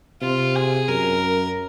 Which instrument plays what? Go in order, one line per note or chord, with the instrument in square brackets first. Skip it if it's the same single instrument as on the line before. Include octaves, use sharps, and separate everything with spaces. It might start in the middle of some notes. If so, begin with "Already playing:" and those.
[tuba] C3 [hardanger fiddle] F4
[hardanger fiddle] G#4
[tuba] F#2 [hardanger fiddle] A#4